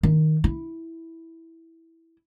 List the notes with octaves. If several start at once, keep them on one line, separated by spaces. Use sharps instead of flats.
D#3
E4